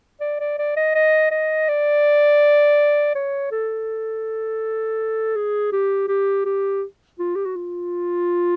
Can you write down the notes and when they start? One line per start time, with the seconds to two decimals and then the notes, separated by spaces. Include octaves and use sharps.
0.21 D5
0.40 D5
0.59 D5
0.77 D#5
0.95 D#5
1.31 D#5
1.68 D5
3.15 C#5
3.51 A4
5.36 G#4
5.72 G4
6.08 G4
6.45 G4
7.19 F4
7.36 G4
7.45 F#4
7.56 F4